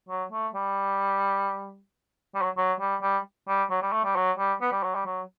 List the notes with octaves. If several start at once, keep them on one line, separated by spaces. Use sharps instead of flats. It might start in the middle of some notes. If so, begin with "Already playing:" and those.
F#3
A3
G3
G3
F#3
F#3
G3
G3
G3
F#3
G3
A3
G3
F#3
G3
B3
G3
F#3
G3
F#3